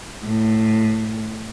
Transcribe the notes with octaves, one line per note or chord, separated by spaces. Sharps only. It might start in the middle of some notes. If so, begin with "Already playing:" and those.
A2